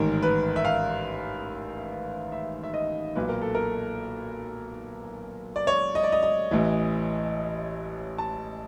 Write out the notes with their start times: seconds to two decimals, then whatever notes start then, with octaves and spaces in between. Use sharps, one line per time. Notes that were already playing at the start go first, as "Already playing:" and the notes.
Already playing: A1 G#2 D#3 A#4
0.23 B4
0.56 E5
0.65 F5
2.32 E5
2.64 E5
2.74 D#5
3.15 B1 A#2 B4
3.29 A#4
3.42 A4
3.55 A#4
5.56 D5
5.67 C#5
5.95 D#5
6.03 D5
6.12 D#5
6.23 D#5
6.51 A1 A2 E3
8.18 A5